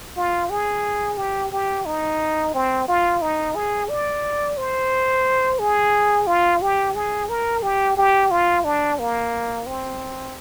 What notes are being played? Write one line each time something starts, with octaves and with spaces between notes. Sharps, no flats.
F4
G#4
G4
G4
D#4
C4
F4
D#4
G#4
D5
C5
G#4
F4
G4
G#4
A#4
G4
G4
F4
D4
A#3
C4